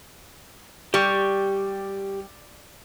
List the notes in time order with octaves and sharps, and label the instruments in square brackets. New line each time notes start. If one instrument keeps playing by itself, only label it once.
[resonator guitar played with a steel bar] G3 [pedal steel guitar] G4 C#6